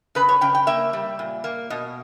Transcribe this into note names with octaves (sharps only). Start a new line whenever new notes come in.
C#3 B4
C#5
C#3 G5
G5
A#3 E5
G3
A#2
A#3
B2 D#5